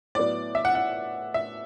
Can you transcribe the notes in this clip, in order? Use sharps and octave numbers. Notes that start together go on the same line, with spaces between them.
A2 F#3 B3 D5
E5
F#5
F#5
E5